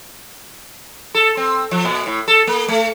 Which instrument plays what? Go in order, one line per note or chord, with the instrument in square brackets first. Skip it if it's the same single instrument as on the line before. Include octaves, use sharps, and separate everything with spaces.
[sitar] A4
C4
F3
A#2
A2
A4
A#3
A3